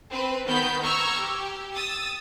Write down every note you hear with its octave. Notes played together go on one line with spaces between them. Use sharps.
C4 B4
D#3 B3 B4 G6 B6
A#5 C#6 E6 F6 G#6
G4
D#6 E6 A6